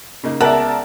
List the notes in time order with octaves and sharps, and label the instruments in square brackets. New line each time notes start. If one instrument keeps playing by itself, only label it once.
[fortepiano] C#3 A#3 D#4
[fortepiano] C#2 G#3 B3 [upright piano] A#4 D5 E5 [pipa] F#5 [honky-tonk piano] A5